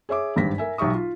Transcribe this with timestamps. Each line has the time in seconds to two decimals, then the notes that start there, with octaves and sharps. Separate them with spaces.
0.09 G#4 C#5 E5 D6
0.36 G#1 G2 G4 A#6 B6
0.58 A#4 E5 G#5
0.78 B1 G4 E5 C#6 D#6
0.94 F4